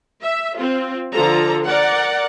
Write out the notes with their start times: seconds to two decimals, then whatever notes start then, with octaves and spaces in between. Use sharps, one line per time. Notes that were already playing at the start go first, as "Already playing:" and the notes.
0.22 E5
0.57 C4 F4
1.12 D3 F3 F4 A4 A#5
1.65 A#4 D5 F#5